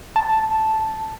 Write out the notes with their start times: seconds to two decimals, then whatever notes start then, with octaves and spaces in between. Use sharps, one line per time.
0.16 A5